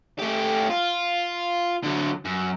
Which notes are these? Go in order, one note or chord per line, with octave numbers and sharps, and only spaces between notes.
A3 G4
F4
D3 F#3
F#2